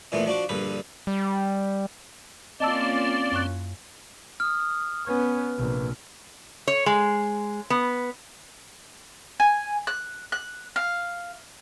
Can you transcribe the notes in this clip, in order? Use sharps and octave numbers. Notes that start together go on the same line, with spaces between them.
A#2 E3 F3 A3 B3
F3 D4 F#4 D6
A#1 G2 D3 B4
G3
A#3 C4 C#4 F4 D5 D#5 A5 E6
F#2 C#6 F#6
D#6 F6
B3 C#4 B4
A#1 C3
C#5
G#3
B3
G#5
F#6
F#6
F5